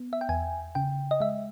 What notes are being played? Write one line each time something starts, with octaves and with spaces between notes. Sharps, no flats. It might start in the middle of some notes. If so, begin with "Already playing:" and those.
Already playing: B3
E5
G5
E2 G#5
C#3 G5
D#5
G#3 E5